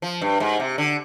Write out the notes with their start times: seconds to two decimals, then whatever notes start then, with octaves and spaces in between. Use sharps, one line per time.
0.02 F3
0.21 G2
0.40 G#2
0.60 C3
0.78 D3